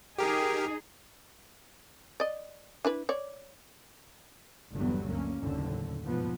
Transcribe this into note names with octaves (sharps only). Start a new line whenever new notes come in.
D#4 G4 G#4 A#4
D5 D#5
D4 E4 B4
C#5 D5
G1 E2 G2 F#3 G3 B3
D2 A#3 C#4
F#1 D#2 A2 D3
E2 G#2 B2 F3 B3